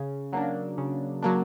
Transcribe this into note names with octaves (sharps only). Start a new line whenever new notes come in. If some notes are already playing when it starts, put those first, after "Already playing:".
Already playing: C#3
F#3 A#3 D4
C#3
F#3 A#3 D4